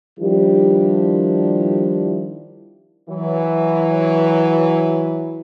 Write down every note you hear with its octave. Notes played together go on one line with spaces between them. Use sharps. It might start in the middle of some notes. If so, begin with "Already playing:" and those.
D#3 F3 G3 D4 E4 G4
E3 F#3